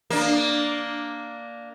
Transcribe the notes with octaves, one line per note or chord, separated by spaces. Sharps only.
A#3 D4